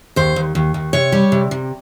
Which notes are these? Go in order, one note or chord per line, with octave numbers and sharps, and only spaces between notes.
D#2 C5
D#2
D#2
D#2
C3 C#5
G3
C3
C3